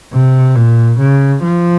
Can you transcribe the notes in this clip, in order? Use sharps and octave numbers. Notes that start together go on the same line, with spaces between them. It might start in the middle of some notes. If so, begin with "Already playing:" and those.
C3
A#2
C#3
F3